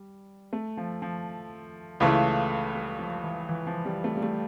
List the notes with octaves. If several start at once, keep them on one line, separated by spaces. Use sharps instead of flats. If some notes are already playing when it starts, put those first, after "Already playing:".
Already playing: G3
A3
F3
F3
C#2 C#3 E3 A3
G3
F3
E3
E3
F3
G3
A3
G3
A3